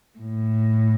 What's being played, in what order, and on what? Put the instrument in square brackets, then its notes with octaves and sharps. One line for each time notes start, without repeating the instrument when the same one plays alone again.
[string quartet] A2